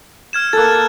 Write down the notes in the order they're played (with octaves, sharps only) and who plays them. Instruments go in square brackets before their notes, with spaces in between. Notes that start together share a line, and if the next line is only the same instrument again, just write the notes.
[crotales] F6 G#6 E7
[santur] A#3 A4 [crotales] F#6 A6